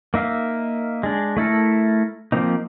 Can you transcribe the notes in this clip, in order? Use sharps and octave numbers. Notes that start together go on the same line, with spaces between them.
A#3 D#4 E5 F5
G#3 D4
A3 E4 A4 A#4
F3 A#3 C4 D#4